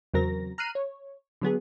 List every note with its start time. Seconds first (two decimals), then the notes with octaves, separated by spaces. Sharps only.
0.13 E2 C#3 F#3 C4 A#4 A#6
0.58 A#5 F6 F#6 C7 D#7
0.75 C#5
1.41 D3 F#3 B3 G#4